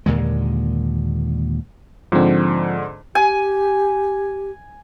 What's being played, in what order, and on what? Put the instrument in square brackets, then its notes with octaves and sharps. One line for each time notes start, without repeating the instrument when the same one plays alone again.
[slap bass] D#2 A#2 D3 G#3
[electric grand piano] G#2 D3 [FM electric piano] F3 C4
[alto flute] G4 [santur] G#5